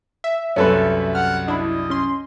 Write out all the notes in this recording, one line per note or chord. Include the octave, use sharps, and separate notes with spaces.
E5
C2 F#2 C#4 A4 B4
F#5 F6
D4 E4 D#5
C#4 C6